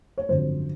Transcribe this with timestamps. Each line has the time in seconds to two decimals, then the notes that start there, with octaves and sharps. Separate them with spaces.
0.18 C#5
0.29 G#1 F#2 D3 F3 C5